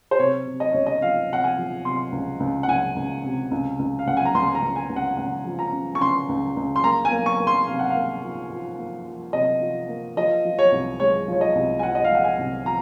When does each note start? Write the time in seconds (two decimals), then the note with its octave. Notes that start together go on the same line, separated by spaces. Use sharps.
0.11 C5
0.19 C3 C#5
0.47 C3
0.60 D#5
0.73 C#2 C#5
0.87 D#5
1.02 F3 F5
1.30 C3 F#5
1.44 G#5
1.57 F3
1.85 C3 C6
2.12 C#2
2.40 C#2
2.63 F#5
2.68 C#2 G#5
2.96 C#2
3.24 C3
3.51 C#2
3.79 C#2
3.99 F5
4.07 C#2 F#5
4.17 G#5
4.25 A#5
4.34 C#2 C6
4.55 A#5
4.62 C#2
4.76 G#5
4.90 C#2
4.96 F#5
5.17 C#2 F#5
5.45 F3
5.59 A#5
5.73 C#3
5.95 C#6
6.01 C#3 C6
6.29 C#2
6.57 C#2
6.76 C6
6.84 A#3 A#5
7.05 G#5
7.11 A#3
7.26 C#6
7.40 A#3
7.47 C6
7.67 C3 F5
7.79 F#5
7.90 F5
7.95 A#3
8.23 F3
8.50 F3
8.78 A#3
9.06 F3
9.33 C3 D#5
9.61 F3
9.89 A#3
10.17 F3 D#5
10.45 F3
10.59 C#5
10.72 C2
11.00 G#3 C#5
11.28 F3 C#5
11.41 D#5
11.55 C2
11.79 G#5
11.83 F3 F#5
11.95 D#5
12.04 F5
12.11 G#3 F#5
12.24 G#5
12.39 C2
12.66 F3 A#5